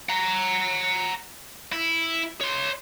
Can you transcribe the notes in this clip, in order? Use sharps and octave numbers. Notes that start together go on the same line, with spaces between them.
F#5 A#5
E4
C#5 C6